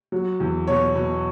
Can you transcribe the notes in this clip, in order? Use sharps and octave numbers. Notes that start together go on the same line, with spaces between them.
F#3
E2
B2 C#5
B2